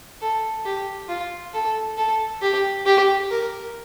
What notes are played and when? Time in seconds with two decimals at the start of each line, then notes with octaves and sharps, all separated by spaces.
0.21 A4
0.65 G4
1.09 F4
1.53 A4
1.97 A4
2.42 G4
2.86 G4
3.31 A#4